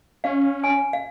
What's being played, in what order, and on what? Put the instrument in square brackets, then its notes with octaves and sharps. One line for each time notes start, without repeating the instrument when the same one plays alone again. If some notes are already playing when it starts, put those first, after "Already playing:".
[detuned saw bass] C#4 [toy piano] F5
[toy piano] G#5
F5